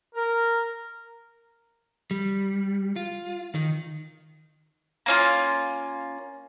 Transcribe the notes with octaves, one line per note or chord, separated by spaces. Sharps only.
A#4
G3
F4
D#3
A#3 C#4 F4